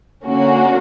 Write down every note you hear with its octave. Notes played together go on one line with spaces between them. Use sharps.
D3 A#3 C#4 F#4